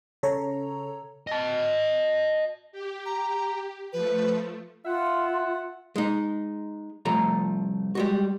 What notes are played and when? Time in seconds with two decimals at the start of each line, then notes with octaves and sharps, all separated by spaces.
0.23 C#3 A4 C#5 A#5
1.27 D#5 A5
2.72 G4
3.06 A#5
3.93 F3 A3 B4
4.86 F4 E5 F#5
5.96 G#3 D#4
7.05 C2 F3 A3 A#5
7.95 G3 G#3 F#4